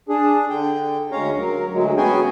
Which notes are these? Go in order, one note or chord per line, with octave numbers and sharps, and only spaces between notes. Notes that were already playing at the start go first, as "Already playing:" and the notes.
D4 G#4
D3 G5
D2 G#3 C#4 C#5 F5 A#5
F#3 A#4
D2 F#3 G#3
B3 C#4 F#4 G#4 G5 G#5